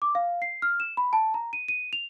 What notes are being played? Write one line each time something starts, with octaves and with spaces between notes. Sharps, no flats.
D6
F5
C7
F6
E7
B5
A5
A#5
D#7
D#7
F7